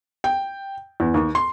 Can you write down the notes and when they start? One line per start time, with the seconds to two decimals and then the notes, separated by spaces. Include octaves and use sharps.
0.24 G5
1.00 E2
1.14 D#2
1.35 C6